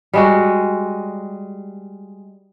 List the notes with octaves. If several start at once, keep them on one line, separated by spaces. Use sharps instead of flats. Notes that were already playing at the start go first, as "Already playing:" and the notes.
G3 G#3 F#4